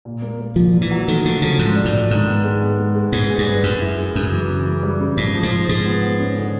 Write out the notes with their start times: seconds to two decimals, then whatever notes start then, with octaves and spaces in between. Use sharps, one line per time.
0.05 A#2
0.22 A#3
0.40 A#3
0.56 A#2 F3
0.74 A#2
0.82 E3
0.91 F#3
1.08 D#3 A3
1.25 D3 F3
1.42 C#3 F3
1.59 G#2 F3
1.76 D4
1.85 A2
1.93 D4
2.10 G#2 D#3
2.27 B3
2.44 G#3
2.61 B3
2.78 G#3
2.95 G#3
3.12 G#2 B3
3.30 G#4
3.38 G2
3.46 B4
3.63 F#2 G#4
3.81 E4
3.98 G#4
4.15 F#2 C#3
4.32 E3
4.49 C#3
4.66 E3
4.83 G3
5.00 C#3
5.17 G#2 F3
5.35 F3
5.43 G#2
5.51 F3
5.69 G#2 G#3
5.86 B3
6.02 B3
6.19 C#4
6.36 D3